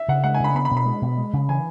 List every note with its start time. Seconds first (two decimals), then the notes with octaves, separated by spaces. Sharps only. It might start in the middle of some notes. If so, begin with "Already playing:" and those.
Already playing: E5
0.08 C#3 F#5
0.24 G#3 F#5
0.34 G#5
0.40 C#3 B5
0.55 B3 B5
0.65 B5
0.71 B2
0.77 B5
0.86 G#3
1.02 B2
1.18 G#3
1.33 C#3
1.49 E3 G#5